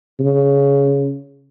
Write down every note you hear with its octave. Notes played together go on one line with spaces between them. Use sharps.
C#3